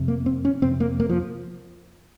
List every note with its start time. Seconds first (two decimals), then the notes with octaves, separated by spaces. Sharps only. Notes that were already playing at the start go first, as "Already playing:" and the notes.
Already playing: F2 C3
0.08 A#3
0.26 C4
0.45 C#4
0.62 F2 C3 C4
0.80 A#3
1.00 A#3
1.09 F3